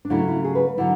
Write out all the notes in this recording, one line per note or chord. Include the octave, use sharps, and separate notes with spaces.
D4
C#3 F#3 A3 E4
E4
G#4
B4
D3 F#3 E4